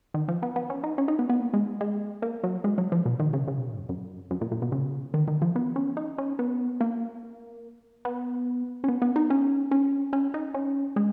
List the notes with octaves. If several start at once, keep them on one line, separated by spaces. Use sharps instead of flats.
D#3
F3
B3
B3
C#4
D#4
C#4
D#4
B3
B3
A#3
G#3
G#3
A#3
F#3
G#3
F#3
F3
B2
D#3
C#3
C#3
B2
A#2
G#2
F#2
F#2
F#2
A#2
A#2
B2
C#3
D#3
D#3
F3
B3
C#4
D#4
C#4
B3
A#3
B3
C#4
B3
B3
D#4
C#4
C#4
C#4
D#4
C#4
G#3